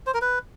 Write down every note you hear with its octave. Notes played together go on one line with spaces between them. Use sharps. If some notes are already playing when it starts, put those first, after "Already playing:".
C5
A#4
B4